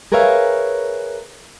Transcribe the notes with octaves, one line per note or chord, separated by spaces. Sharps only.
G#4 A#4 B4 C#5 E5 F5